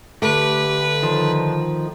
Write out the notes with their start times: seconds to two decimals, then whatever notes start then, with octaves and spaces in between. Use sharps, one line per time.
0.22 D3 A3 G4 B4
1.03 D#3 F3